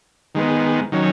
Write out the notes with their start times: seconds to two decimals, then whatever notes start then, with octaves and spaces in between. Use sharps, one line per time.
0.35 D#3 G#3 B3
0.92 D#3 F#3 C#4